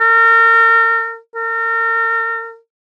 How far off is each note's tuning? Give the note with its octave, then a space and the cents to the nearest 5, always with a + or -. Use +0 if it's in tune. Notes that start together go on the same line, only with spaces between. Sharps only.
A#4 -35
A#4 -35